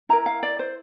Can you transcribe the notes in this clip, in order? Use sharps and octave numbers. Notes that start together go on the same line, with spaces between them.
E4 A#4 A#5
F5
D5
C5